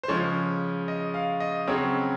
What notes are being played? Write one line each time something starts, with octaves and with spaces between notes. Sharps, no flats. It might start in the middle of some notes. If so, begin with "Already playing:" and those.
C5
C#3 F3 G#3 C#5
D#5
F5
D#5
C#3 F#3 C4 C#5